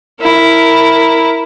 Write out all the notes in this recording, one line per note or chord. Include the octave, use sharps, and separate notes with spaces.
E4 A#4